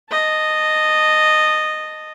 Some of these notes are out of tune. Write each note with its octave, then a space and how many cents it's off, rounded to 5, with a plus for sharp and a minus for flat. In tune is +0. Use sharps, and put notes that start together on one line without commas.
D#5 -10 A5 +5